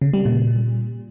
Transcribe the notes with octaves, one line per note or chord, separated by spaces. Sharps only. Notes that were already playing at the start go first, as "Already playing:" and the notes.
C#3
G3
A#2